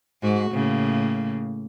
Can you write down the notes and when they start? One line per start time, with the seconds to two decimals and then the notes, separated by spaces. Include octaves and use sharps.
0.22 G#2 F#4
0.52 A2 C#3 A#3